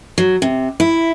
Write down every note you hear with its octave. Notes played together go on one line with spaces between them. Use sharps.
F#3
C3
E4